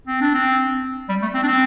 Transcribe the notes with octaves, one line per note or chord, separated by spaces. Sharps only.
C4
D4
C4
G3
A3
C4
D4
C4